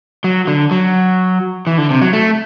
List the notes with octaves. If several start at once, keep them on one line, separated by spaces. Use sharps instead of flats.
F#3
D3
F#3
E3
D3
C3
F#3
A3